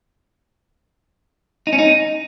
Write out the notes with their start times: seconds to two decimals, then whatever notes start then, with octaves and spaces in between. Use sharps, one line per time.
1.67 D#4
1.73 C#4
1.78 D#4